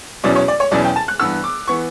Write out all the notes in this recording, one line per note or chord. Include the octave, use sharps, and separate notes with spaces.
E2 B2 F#3 C#4 E4 D5
C#5
D5
C#5
E2 B2 F#3 C#4 E4 D5
G5
A5
F#6
G2 E3 B3 E6
D6
E3 B3 C#6